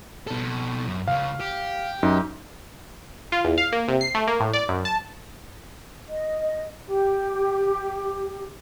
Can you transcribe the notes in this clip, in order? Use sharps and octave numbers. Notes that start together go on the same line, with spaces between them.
B2 A4
F#2
C#2 C#3 F5
G4
F#2 D#4
F4
E2
F5
A#3
C3
C7
A3
A#3
A2
D5
F#2
A5
D#5
G4